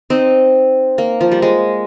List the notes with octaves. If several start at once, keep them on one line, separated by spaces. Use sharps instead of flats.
C4 D#4
A#3
F3
G3
G#3